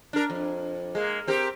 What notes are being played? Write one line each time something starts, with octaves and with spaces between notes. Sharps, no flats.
D4 A#4
F2
G#3 A#3
C4 G4 A#4